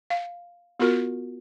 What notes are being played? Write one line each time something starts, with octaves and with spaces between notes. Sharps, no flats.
F5
B3 F4 F#4 A#4